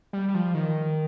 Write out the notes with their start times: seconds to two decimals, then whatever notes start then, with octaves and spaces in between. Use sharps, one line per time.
0.13 G3
0.28 G3
0.35 F3
0.54 D#3